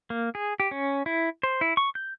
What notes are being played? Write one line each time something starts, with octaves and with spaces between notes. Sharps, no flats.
A#3
G#4
G4
C#4
E4
C5
E4
C#6
G6